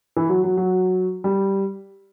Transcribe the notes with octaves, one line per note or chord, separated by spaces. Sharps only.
E3
F#3
F#3
F#3
G3